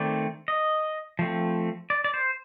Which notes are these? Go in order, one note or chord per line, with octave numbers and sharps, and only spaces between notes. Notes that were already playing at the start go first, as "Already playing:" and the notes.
Already playing: D#3 A3 C4 D5
D#5
F3 A3 C4
D5
D5
C5